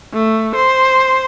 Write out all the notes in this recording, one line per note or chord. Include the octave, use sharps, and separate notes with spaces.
A3
C5